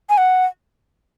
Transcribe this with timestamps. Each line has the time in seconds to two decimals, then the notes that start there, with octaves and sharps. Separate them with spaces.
0.10 G#5
0.18 F#5